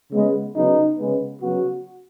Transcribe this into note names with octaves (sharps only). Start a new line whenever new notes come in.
C#3 G#3 B3
C#3 F#3 B3 D#4
C#3 G#3 B3
C#3 F#3 B3 F#4